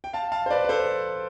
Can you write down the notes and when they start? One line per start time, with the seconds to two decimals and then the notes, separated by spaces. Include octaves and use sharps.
0.04 G5
0.13 F5 A5
0.32 F5 A5
0.46 C5
0.50 B4 D5
0.64 B4
0.69 A4 C5